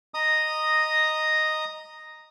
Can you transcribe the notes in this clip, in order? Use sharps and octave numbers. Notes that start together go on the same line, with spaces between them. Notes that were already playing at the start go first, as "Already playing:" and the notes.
D#5 A#5 D#6